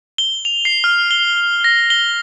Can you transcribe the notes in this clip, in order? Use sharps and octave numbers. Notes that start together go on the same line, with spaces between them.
G7
F7
C7
F6
G7
A#6
G7